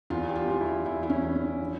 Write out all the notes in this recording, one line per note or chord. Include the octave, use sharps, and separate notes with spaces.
E2 F4
G4
F4
E2 F4
E4
E2 E4
E4
C#4
E2
C#4
F3